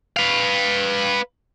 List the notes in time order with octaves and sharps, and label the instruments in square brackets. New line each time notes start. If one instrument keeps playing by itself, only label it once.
[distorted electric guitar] B4 F5